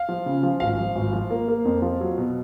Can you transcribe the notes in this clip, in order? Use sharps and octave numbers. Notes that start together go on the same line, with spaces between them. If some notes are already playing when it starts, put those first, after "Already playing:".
Already playing: F5
F3
C#3
F3
G#1 F5
F3
G#1
F3
A#3
A#3
F2
F3
F#3
B2